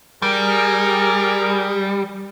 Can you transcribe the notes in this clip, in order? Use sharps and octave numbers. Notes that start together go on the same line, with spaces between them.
G3 G#4 A#4